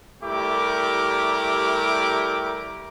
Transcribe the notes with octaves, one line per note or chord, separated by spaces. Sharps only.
G3 A3 E4 G4 A#4 D6